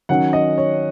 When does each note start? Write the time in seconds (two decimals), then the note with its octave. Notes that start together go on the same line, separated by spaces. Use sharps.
0.09 D#3 F#3 C#4 F#5
0.33 D#5
0.58 C#5